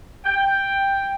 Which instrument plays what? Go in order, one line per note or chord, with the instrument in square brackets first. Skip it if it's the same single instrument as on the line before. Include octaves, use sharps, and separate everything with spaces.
[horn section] G5